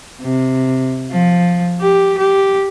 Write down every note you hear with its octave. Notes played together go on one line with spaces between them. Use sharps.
C3
F3
G4
G4